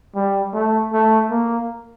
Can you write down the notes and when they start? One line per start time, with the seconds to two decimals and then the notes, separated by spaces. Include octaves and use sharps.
0.15 G3
0.53 A3
0.93 A3
1.30 A#3